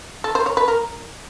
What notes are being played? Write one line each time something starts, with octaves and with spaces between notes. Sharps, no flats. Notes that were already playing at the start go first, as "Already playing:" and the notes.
A4
C5
C#5
B4
A#4